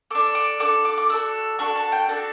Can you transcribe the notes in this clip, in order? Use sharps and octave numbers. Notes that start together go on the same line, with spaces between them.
D4 A4 D6
D6
D4 F#4 A4 D6
D6
D6
D4 F#4 A4 E6
D4 F#4 A4 C#6
A5
G5
D4 F#4 A4 A5